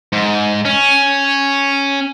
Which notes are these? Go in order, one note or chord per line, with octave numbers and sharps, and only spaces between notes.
G#2
C#4